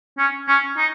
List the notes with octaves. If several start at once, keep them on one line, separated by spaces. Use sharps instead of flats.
C#4
C#4
D#4